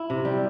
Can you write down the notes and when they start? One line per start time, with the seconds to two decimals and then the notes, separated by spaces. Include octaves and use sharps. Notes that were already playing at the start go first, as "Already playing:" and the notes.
Already playing: E4
0.10 C3
0.25 G3